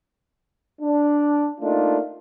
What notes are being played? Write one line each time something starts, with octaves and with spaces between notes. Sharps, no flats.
D4
A3 A#3 D4 D#4 F4